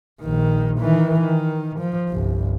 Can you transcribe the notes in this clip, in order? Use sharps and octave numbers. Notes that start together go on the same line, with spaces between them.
A#1 D#3
D#3 E3
D#3
F3
G1 C2